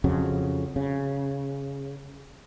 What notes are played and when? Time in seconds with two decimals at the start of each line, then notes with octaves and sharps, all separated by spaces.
0.04 F2 C#3 F#3
0.76 C#3